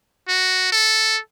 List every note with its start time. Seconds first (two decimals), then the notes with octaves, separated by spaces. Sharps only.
0.28 F#4
0.72 A4